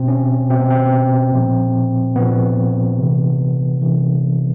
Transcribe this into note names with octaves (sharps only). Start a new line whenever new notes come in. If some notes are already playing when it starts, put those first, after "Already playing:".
Already playing: B2 C4
C#4
B2 C4
B3
C4
A#2 F3
A#2 F3 B3
C3 E3
C3 E3